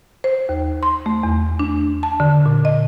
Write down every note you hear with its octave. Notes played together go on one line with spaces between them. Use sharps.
C5
D#2
C6
A3
E2
D4
A5
D3
A#2
D#5